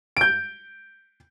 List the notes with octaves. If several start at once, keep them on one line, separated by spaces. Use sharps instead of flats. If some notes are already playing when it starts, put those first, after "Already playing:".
G6 D7